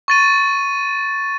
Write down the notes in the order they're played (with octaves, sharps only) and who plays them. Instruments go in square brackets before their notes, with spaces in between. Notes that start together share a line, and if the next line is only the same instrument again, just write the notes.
[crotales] C#6 A6 D#7